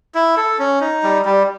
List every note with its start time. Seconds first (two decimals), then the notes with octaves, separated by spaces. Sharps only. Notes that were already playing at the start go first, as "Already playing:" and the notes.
0.15 E4
0.37 A4
0.59 C#4
0.81 D#4
1.03 G3
1.25 G3